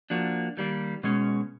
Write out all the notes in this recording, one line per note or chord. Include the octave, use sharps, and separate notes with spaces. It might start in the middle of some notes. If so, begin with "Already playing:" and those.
F3 A#3 D4 F#4
D#3 G3 A#3
B2 G#3 C#4